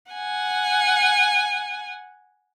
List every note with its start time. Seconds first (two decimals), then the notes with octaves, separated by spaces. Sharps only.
0.12 F#5 G#5